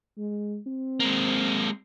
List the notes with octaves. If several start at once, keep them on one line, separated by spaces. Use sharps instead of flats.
G#3
C4
G#3 A#3